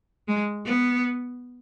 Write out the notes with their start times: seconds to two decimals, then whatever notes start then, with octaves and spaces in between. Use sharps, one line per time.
0.28 G#3
0.65 B3